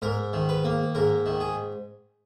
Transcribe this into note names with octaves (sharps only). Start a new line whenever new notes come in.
G#2 A#4
D#3
B4
A#3
G#2 A#4
D#3
G#4